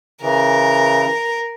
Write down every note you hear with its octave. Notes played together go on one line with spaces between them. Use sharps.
C#3 E3 A#4